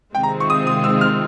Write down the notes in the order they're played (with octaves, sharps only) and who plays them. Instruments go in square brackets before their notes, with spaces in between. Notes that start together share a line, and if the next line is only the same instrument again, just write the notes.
[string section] C3 D#3 G#3 C4 F4 [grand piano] G5
[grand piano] A#5
C#6
D#6
D#6
E6
F6